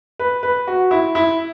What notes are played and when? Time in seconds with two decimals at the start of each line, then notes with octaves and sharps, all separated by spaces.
0.19 B4
0.43 B4
0.67 F#4
0.91 E4
1.15 E4